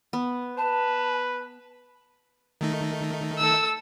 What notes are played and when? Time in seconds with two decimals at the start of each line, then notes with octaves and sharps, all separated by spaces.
0.13 B3
0.57 B4 A5
2.61 D#3 A3 D#4
3.38 A4 E6